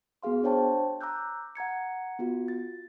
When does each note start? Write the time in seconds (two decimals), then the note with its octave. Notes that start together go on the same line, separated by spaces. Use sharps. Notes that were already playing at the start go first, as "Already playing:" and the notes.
0.23 B3 F#4 G#4 F5 C6
0.43 D4 C5 C#5 G5 A5
1.01 A#5 D6 E6 F#6 G6
1.55 F#5 A#5 G#6 C#7
2.19 B3 F4 F#4
2.48 A6